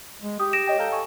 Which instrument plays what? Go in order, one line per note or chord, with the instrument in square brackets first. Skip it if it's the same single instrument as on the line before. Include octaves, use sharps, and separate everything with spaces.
[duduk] G#3
[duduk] G4 [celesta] D#6
[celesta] A#6 D7 E7
[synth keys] C#5 D#5 G5
[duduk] A4 [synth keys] F5 A#5 G6
[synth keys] G#5 C#6